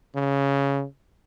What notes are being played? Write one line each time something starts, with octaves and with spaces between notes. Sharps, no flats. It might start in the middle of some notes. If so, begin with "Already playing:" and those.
C#3